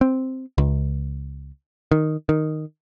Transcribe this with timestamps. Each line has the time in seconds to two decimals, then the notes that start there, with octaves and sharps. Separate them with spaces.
0.01 C4
0.58 C#2
1.92 D#3
2.29 D#3